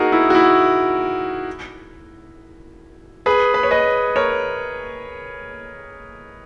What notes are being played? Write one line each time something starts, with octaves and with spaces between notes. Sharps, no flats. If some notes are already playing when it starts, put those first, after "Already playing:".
Already playing: D#4 F#4 G#4 A#4
E4
F#4
E4
G#4 B4
B4
C#5
B4 D#5
A#4 C#5